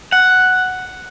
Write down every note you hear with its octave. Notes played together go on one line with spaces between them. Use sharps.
F#5